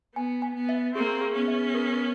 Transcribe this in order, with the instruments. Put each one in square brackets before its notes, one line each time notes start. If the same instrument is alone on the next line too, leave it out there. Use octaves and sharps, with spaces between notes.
[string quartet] B3 [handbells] G#5
[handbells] G#5
[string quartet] B3
[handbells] E5
[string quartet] A#3 C4 [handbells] G#4
[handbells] G#4
[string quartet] B3 C#4
[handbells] E5
A#4